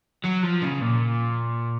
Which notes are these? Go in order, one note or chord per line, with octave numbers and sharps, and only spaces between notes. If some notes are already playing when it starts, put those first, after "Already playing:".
F#3
F3
C#3
A#2